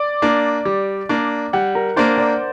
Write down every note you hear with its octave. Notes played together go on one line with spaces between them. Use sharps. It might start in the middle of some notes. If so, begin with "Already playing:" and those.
Already playing: D5
A#3 D4
G3
A#3 D4
G3 F#5
A#4
A#3 D4 C5
D5